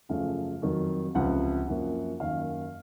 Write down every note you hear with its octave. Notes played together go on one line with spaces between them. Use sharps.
F#2 C#3 F3 A3 F5
F2 D#3 F#3
C#2 C3 F3 F#5
F#2 F3 A#3
F#2 D#3 A#3 F5